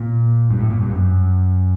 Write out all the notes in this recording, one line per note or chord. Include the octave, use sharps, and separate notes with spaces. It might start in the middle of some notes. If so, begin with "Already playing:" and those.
Already playing: A#2
G2
A2
A#2
G2
F#2